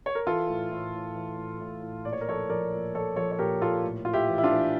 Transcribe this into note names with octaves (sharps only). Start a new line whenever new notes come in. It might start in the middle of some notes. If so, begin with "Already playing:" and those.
C#5
A#4
E3 F4 A4
A2
A2
A2
E3
A2
A2
A2
A#2 D5
C#5
A#4
F3 A4 C#5
F3 A#4 D5
A#2
F3 A4 C#5
F3 A4 C#5
C#5
A#2 G4 A#4
A#2 F4 A4
A2
A2 F4
E4 G4
E3
E4
D4 F4
E3